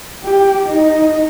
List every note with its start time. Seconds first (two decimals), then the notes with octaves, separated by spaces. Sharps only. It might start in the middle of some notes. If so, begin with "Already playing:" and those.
0.24 G4
0.66 D#4 D#5